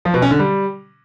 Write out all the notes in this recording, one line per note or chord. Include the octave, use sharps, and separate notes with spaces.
F3
B2
C#4
D3
G3